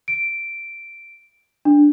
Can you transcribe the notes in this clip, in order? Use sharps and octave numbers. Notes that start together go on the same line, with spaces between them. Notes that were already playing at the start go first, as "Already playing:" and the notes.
D7
D4